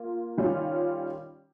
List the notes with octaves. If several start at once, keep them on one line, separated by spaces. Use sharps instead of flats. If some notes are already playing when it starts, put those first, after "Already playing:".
Already playing: A#3 F4
D#3 G3 C#4 F4